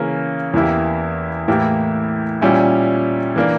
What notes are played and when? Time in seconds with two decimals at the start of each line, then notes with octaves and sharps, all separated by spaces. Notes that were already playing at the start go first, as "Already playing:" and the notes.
Already playing: C#3 E3 A#3 C#4
0.54 E2 E3 A#3 E4 G4
1.48 A2 E3 A#3 E4 G4
2.41 A#2 G3 C#4 E4
3.36 E3 A#3 D4